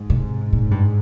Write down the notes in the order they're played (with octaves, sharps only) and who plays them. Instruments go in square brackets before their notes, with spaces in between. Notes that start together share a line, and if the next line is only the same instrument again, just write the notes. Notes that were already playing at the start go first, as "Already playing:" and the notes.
Already playing: [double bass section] G#2
[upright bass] C3
A#2
G2